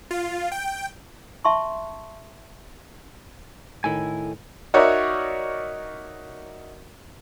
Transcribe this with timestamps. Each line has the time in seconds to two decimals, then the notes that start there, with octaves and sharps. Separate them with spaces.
0.11 F4
0.52 G5
1.45 E5 A5 C6 C#6
3.84 A2 D#3 E4 A4 G#5
4.74 D#4 F#4 A#4 C#5 D5 E5